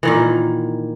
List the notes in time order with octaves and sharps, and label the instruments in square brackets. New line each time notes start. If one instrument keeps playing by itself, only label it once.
[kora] A#2 D#3 E3